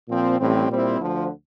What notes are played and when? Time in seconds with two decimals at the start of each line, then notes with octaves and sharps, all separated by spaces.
0.09 A#2 F3 C4
0.39 A1 A2 G3 C4
0.69 A#2 G3 C4 E4
1.00 D2 D3 F3